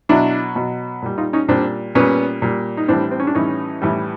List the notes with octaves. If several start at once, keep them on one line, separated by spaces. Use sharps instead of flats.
B2 F#3 D4 E4
B2 F#3
A#2 G3
D#4 F4
C#4 D#4
A#2 G3 C4 D4
A#2 G3 B3 C#4
A#2 G3
D#4
A2 E3 G3 C4 D4
C4
C#4
D4
A2 E3 G3 C#4 D#4
A2 E3 G3